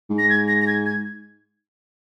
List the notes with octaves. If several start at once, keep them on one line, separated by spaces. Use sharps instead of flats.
G#2
A#6
G#6
A#6
A#6
G#6
G#6